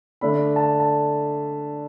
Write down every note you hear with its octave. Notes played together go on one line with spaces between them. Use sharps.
D3 A3 D4 B5
A5
A5